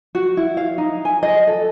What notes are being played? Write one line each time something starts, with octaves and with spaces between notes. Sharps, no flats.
F#4
E4
F5
D#4
G#5
D#5
A4